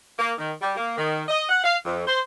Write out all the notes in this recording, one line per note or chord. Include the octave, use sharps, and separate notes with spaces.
A#3
D#3
G3
A#3
D#3
D#5
F#5
F5
F2
C5